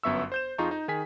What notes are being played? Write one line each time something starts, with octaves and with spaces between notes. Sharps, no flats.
G1 F#2 B3 E5 C#6 E6
C5 G6 E7
F2 D#4 F4 G#4 A#5 C#6
D#4
D#3 G#4 G#5 B6